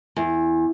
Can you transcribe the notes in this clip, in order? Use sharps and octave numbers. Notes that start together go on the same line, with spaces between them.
E2